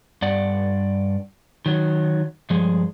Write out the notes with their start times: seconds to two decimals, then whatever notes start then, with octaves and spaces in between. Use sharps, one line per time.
0.22 G2 D5 F#5
1.66 D#3 F#3
2.50 G2 F3 G#3